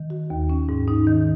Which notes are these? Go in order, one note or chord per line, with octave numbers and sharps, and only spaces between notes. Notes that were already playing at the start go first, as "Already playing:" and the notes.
Already playing: D#3
F#4
D#2
C#4
G#2
D#4
D#3